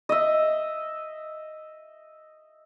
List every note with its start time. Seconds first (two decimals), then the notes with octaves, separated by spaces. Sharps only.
0.09 D#5 E5